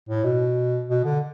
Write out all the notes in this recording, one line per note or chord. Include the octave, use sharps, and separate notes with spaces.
A2
B2
B2
D3